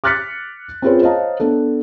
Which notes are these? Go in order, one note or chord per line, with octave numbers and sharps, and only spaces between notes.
D6 F6 F#6 A6 B6 C#7
C4 C#4 F4 G#4 B4 C5
C5 C#5 D#5 F5 A5 A#5
B3 D4 A4